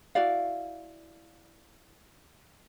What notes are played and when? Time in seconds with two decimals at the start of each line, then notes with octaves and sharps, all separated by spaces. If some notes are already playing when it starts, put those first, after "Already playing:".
0.15 E4 F#4 D5 F5